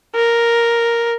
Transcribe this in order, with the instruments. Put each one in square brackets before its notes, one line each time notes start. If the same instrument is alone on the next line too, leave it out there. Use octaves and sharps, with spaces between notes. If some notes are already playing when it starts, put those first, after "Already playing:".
[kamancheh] A#4